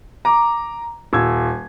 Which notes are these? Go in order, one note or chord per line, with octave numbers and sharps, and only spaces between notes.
A#5 D6
D#1 E6 G#6